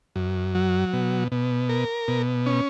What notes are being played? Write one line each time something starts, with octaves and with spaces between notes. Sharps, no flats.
F#2
F#3
B2
B2
A#4
B2
C#4